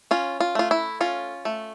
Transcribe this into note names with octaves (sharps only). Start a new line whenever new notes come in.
C#4 F4
F4
A3 F4
E4
C#4 F4
A3